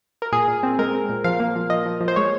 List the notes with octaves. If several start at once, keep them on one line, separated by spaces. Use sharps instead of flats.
A#4
A#2 G#4
A#2
C4
G#3 A#4
C4
A#2
F3 F5
A#3
F3
F3 D#5
F3
F3
C5
G#3 C#5